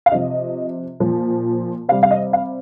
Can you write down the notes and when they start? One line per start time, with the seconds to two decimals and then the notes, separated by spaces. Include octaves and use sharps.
0.06 F5
0.12 C3 F3 D#5
1.00 A#2 F3
1.89 C3 F5
1.92 G3
2.03 F5
2.11 D#5
2.33 F5